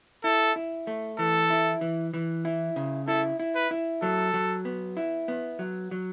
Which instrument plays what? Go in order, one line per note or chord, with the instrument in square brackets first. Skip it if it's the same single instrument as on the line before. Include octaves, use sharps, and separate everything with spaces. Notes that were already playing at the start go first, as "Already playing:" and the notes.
[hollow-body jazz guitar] E4 [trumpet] A4
[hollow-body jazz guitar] E4
A3
[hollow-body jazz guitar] E3 [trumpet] A4
[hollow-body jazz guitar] E4
E3
E3
E4
C#3
[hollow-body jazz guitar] E4 [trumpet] A4
[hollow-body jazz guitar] E4
[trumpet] B4
[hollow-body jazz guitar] E4
[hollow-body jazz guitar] F#3 [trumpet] A4
[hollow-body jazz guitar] F#3
B3
E4
B3
F#3
F#3